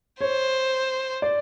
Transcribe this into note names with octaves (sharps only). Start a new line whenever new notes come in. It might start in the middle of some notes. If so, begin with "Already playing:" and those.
C5 C#5
D5